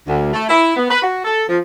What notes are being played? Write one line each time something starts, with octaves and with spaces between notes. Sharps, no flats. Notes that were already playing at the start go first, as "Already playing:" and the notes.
D2
A3
E4
B3
B4
F#4
A4
F3